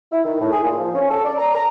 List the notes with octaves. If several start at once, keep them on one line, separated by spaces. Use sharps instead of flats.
E4
D#3
A2
G#4
A#2
F3
C#4
A4
D5
A#5
A#5